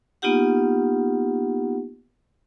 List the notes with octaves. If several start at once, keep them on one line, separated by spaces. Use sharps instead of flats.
A#3 B3 D#4 F4 G4 F#5